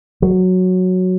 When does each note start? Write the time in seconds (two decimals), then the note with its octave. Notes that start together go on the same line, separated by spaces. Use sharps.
0.22 F#3